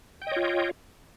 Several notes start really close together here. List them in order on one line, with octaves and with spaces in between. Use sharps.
G5 D#5 C#5 F4